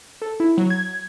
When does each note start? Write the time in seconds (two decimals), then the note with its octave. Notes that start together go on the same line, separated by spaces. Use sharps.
0.22 A4
0.40 E4
0.58 F#3
0.70 G#6